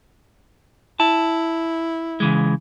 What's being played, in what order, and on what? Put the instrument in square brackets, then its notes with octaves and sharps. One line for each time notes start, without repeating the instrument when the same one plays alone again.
[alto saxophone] E4 [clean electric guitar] A5
[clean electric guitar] C#3 E3 G#3